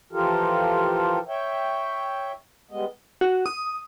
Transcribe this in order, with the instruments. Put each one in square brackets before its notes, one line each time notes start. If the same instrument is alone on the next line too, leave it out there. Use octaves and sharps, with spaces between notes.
[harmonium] E3 F3 F4 G4 A4 A#4
C#5 E5 G5
G3 G#3 B3 D#5
[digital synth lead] F#4
D#6